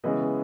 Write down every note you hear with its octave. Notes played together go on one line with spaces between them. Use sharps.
C#3 E3 G#3 B3 D#5